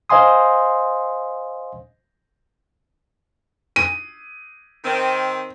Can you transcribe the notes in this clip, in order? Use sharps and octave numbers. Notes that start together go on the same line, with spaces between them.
C5 D#5 F5 G#5 C6 D#6
D#7
D#3 C4